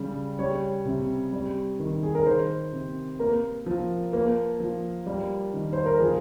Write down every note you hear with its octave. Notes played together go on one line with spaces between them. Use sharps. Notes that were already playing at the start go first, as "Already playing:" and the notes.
Already playing: C#3 G3
G3 C#5
C3
G3
D#3
G#4
A#4
D#3 C5
C3
A#3 A#4
F3
A#3
F3
G3
D#3
C5
A#4
F3 G#4